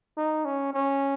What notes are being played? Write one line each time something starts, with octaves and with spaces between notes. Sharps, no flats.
D#4
C#4
C#4